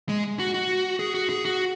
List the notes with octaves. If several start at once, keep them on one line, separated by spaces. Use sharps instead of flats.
G#3
F#4
F#4
G#4
F#4
G#4
F#4